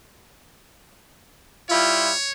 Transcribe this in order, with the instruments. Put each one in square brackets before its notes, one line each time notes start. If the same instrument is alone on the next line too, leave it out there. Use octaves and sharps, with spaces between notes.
[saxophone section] G3 E4 F4 [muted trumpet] C#5